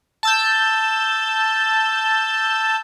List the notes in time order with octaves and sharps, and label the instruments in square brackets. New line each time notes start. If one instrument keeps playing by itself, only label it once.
[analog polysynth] A5 E6 G6